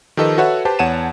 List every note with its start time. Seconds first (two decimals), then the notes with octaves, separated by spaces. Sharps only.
0.17 D#3 F3 G4 A4 B4 D#5
0.38 F#4 A4 B4 C#5 E5 F#5
0.65 G4 B4 C5 A5
0.79 E2 C#5 F#5 A5 D#7 E7